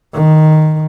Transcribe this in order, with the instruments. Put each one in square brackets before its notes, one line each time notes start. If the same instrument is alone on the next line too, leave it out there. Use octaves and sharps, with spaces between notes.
[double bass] D#3